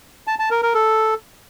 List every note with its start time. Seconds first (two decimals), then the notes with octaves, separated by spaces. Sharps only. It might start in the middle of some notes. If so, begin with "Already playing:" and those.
0.27 A5
0.39 A5
0.51 A#4
0.62 A#4
0.74 A4